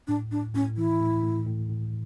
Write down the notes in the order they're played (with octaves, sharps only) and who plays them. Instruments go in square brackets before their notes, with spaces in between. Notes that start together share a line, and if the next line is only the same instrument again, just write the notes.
[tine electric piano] A2 [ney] D4
[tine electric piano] A2 [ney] D4
[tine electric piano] A2 [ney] C#4
[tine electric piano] E3 [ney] E4
[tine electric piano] A2
A2
A2
A2